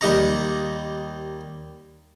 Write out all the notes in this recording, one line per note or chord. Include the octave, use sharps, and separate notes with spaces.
D#2 G3 G4 D#5 F#5 A#5